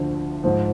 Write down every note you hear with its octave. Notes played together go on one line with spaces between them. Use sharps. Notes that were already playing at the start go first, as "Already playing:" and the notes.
Already playing: D2 D3 F3
G#2 F3